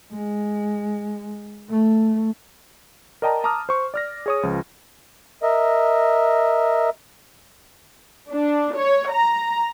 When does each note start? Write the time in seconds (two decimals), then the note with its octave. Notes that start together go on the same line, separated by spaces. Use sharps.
0.13 G#3
1.70 A3
3.22 A#4 D5 D#5 G5 A5 A#5
3.44 A5 A#5 D6 D#6 F6
3.69 C5 C#6
3.94 D5 F6 A#6
4.26 G#4 C#5 D#6
4.43 C#2 F3
5.42 A#4 D#5 E5
8.31 D4
8.77 C#5
9.11 A#5